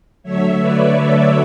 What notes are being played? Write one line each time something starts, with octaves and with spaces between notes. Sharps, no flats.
D3 F#3 A3 C#5 E5
B4 D5
A4 C#5